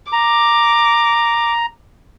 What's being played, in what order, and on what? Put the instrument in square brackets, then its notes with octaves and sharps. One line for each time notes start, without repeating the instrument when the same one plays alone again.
[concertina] A#5 [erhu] D6